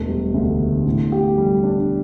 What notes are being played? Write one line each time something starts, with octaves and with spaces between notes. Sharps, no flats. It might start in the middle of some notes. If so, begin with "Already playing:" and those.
Already playing: E1 A3
G3
D2
D3
A2
G4
G3
D4